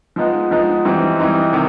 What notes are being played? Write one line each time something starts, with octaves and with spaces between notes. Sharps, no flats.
F3 G#3 B3 D#4
F3 G#3 B3 D#4
E3 G3 C4 D#4
E3 G3 C4 D#4
C3 D#3